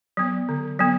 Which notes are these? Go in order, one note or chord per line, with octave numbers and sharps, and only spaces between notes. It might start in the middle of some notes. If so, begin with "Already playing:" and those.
F#3 B3
D3
F#3 B3